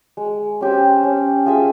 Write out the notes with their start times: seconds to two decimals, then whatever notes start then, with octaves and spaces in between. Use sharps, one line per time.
0.17 G#3
0.61 C#4 G4 C5
1.03 C#4
1.46 F4 G#4 E5